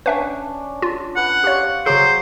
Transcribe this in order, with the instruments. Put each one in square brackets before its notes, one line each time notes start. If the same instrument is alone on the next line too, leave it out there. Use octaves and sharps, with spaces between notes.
[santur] C#4 D4 [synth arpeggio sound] B4 E5 G5
[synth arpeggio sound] F4
[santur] B4 [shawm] F#5
[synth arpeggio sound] G4 C#5 [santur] C5 F5 C#6
[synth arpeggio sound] C#3 G#4 [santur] F#3 C#5 D6 [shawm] C5